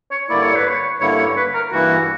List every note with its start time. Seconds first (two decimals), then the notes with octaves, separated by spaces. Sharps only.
0.11 C#5
0.29 G2 D3 A#3 E4 D5
0.42 C#5
0.56 B4
0.68 C#5
1.00 G2 D3 A#3 E4 C#5
1.18 C#5
1.36 B4
1.54 A#4
1.72 G2 E3 A#3 E4 F#4